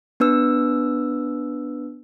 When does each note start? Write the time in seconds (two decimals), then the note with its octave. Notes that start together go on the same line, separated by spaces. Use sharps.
0.20 B3 D4 B4 E6